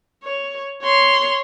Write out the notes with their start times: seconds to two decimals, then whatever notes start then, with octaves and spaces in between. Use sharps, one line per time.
0.24 C#5
0.82 C#5 C6